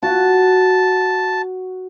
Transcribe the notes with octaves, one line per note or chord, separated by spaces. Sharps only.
F#4 A5